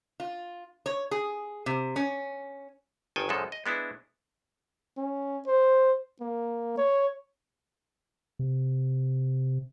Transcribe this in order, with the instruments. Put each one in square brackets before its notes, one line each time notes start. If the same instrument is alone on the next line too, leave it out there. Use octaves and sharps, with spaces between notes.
[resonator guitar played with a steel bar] F4
C#5
G#4
C3
C#4
[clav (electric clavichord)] G1 D#3 A4 G5 G#5
A#1 F#2 C#3 F3 G#3 A4
D#5
G#3 B3 D4 E4
[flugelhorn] C#4
C5
A#3
C#5
[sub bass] C3